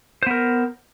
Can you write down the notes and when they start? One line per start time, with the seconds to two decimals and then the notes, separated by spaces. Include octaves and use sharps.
0.23 C5
0.27 B3
0.31 A#4